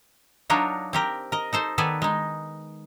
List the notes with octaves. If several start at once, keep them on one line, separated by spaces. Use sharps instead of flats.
F#3 D4 D#4 F4 A#4 C#5
C4 G4 A#4
A#4 D#5
D#4 A4 C5
D#3 B3 A4 B4 D5 G#5
G#3 D#4